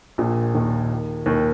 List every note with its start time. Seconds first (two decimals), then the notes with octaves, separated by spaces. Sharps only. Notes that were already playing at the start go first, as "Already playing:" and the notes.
0.18 A#1 A#2
0.54 D#2 D#3
1.26 D#2 D#3